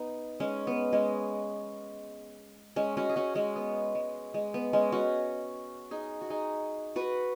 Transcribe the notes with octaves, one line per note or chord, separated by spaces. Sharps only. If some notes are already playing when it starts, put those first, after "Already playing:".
Already playing: B3 D#4
G#3 C#4
B3
G#3 C#4
G#3 C#4
C#4 F#4
G#4
C#4 F#4
G#3 C#4
B3
G#3
G#3
B3
G#3 C#4
C#4 F#4
D#4 G#4
F#4
D#4 G#4
F#4 B4